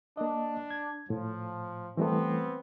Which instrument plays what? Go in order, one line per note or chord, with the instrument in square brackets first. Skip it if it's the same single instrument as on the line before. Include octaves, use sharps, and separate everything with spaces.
[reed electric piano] A#3 D#5 [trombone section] D4
[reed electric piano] G#6
[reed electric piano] A2 [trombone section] F3
[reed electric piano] E3 G3 A3 [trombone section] B3 C4